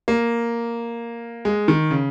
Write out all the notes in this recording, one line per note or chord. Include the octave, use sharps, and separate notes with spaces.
A#3
G#3
D#3
C#3